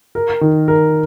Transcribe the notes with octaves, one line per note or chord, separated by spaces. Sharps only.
A#4
D#3
A#4